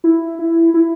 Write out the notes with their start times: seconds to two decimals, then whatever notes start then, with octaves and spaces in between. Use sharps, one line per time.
0.04 E4
0.39 E4
0.74 E4